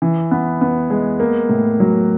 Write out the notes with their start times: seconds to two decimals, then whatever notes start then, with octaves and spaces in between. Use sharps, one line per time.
0.02 E3
0.31 B3
0.61 B3
0.90 G#3
1.20 A#3
1.49 A2
1.80 F#3